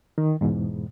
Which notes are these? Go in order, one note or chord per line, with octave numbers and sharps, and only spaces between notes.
D#3
E2 G#2 B2